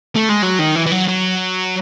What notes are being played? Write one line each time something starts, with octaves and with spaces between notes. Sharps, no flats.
A3
G#3
F#3
D#3
E3
E3
F#3
F#3